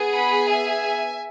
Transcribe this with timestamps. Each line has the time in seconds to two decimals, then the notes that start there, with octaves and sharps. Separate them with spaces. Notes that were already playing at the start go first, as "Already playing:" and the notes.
Already playing: B3 G#4
0.13 F#5 B5
0.49 E5 G#5